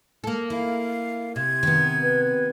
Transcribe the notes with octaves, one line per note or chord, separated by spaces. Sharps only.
A#3 A4
E4 F5
C3 G#6
D#3 B3
B4